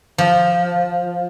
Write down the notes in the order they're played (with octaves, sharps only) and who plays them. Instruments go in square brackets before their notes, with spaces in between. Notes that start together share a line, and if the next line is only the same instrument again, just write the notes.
[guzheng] F3